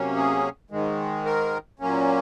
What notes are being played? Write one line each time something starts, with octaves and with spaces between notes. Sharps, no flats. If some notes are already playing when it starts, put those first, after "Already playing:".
Already playing: C3 F#3 A#3 C#4
G#4
G#2 D#3 G#3
A#4
A#2 F#3 A#3 C#4